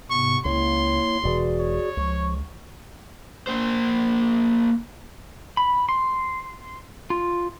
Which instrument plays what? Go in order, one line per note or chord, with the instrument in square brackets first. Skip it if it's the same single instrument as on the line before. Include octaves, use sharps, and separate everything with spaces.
[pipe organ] G#2 C3 B3 [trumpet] C#6
[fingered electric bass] C#2 [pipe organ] A#3 E4 C#5 [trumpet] C6
[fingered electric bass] E1 B2 E3 [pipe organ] F#4 G#4 D5
[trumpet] C#5
[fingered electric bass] C#2 [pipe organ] F3 C#6
[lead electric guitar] A#3 C5
[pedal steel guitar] B5
C6
F4